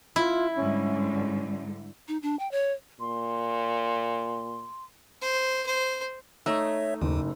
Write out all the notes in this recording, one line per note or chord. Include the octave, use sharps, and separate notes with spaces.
E4 F4
G#2 D3 G3 C#4
D#4
D4
G5
C#5
A#2 C6
C5
C5
A3 D#4 C#5 E5 C#6 E6
F#1 D#2 G#2